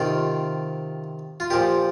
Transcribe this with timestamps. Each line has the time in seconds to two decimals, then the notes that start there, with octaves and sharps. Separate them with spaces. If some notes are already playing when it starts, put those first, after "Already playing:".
Already playing: C3 D#3 F4
1.40 F4
1.50 A#2 F3 G4